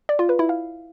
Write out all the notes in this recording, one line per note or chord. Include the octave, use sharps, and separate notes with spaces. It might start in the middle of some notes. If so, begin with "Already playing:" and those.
D5
F4
B4
E4
F5